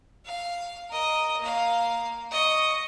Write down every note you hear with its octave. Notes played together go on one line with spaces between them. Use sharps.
F5
A#4 D#5
A#3 F5
D#5 C#6